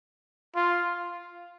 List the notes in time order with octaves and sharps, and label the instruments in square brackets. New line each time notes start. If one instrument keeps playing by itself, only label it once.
[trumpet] F4